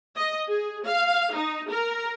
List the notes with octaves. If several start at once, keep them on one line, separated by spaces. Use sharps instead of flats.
D#5
G#4
F5
D#4
A#4